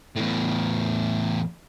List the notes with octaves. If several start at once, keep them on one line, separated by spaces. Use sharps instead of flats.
E2 A2